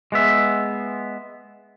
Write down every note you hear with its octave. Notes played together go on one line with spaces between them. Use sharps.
G#3 B3 E5